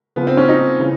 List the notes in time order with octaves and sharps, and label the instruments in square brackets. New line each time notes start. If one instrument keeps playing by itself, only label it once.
[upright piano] C#3 F3 B3
C4
C#4
D#4
C#3 E3